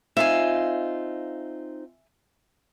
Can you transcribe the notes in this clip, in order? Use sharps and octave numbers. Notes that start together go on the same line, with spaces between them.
C4 D#4 F4 E5 F5 G#5